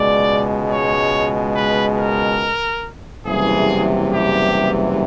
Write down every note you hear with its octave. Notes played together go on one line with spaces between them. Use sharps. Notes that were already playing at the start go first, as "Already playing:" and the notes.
Already playing: C#2 B2 G#3 D5
C#5
B4
A#4
F#1 E2 C3 E3 G3 G#4
G4